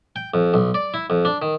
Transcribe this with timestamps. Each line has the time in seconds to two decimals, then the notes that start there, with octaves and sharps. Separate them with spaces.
0.16 G5
0.34 F2
0.54 B1
0.74 D5
0.94 E4
1.10 F2
1.25 D4
1.42 D#3